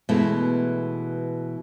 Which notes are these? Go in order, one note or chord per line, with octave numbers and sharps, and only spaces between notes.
B2 E3 G#3 A3